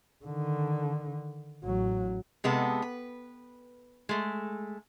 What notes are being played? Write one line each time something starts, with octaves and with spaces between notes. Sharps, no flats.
D3 D#3
A1 F#3
C3 G#3 B3 A4
B4
G#3 A3